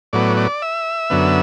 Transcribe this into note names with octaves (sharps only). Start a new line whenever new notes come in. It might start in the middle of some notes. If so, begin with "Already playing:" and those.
A2 F#3 B3 D5
D5
E5
F#2 D3 B3